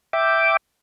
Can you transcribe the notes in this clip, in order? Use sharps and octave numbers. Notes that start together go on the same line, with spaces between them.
E5 G5 D6